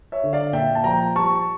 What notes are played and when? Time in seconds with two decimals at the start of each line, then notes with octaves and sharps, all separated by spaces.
0.12 C#5 E5
0.24 D3
0.33 D5 F5
0.53 A#2 E5 G5
0.75 A5
0.84 F3 G5 A#5
1.15 G3 A5 C#6